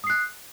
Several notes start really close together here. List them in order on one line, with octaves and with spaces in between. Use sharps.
D#6 C7 F#6